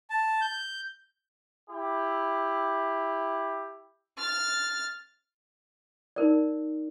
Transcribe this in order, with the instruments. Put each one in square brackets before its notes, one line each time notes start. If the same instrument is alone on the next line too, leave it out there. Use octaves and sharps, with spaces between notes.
[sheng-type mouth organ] A5
G6
[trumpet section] E4 G4
[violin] F6 A6
[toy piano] D#4 A#4 D5